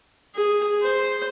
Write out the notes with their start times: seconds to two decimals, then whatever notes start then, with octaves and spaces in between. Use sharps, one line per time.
0.35 G#4
0.82 C5